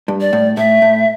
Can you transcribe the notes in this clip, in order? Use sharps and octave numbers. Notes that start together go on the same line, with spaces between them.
G2
D5
A2
A2 E5
A2